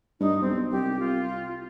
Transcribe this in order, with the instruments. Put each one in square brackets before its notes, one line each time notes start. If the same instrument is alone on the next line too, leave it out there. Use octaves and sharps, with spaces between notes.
[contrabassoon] G2 [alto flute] D#4
[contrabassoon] B1 [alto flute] C4
[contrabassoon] C2 [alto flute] G4
[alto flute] F4